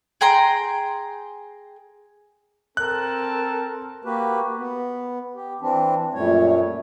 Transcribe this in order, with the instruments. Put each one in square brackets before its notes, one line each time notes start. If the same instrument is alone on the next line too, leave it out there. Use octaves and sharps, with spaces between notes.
[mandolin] G#4 G5 A#5 C6
[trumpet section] C4 A4 A5 [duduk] A#4 [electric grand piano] F#6
[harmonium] A#3 F#4 G4 B4
B3
G4
E3 C4 D4
F#2 A#2 G3 A3 C#5